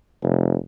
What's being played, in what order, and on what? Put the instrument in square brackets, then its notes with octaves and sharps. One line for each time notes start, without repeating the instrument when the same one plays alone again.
[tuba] F1